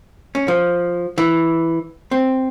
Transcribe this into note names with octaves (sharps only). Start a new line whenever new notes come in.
C#4
F3
E3
C4